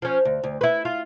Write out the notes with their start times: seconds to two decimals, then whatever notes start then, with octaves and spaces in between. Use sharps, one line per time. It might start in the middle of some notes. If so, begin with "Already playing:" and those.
0.02 F3 C#4
0.25 D2
0.44 D2
0.61 E4 B4
0.85 F4